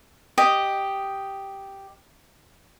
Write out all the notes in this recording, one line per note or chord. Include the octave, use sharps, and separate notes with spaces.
G4 D#5